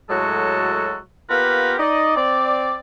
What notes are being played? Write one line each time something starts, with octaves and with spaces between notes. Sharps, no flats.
A2 F#3 G#3 F#4 A4
A#3 B3 F4 G4 A#4 B4
D#4 D5 D#5
C4 D5